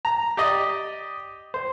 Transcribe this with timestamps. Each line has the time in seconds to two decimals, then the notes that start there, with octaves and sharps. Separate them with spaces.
0.05 A#5
0.37 G4 D5 D#5
1.54 C5